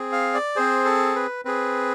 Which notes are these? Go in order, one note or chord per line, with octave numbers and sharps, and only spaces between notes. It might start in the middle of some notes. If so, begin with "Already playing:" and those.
Already playing: C4 G#4
F5
D5
C4 G#4 C5
A4
B4
C4 G#4 B4